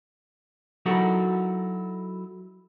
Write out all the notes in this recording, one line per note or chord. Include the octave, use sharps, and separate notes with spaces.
F#3 D#4 E4 F#4 A4 A#4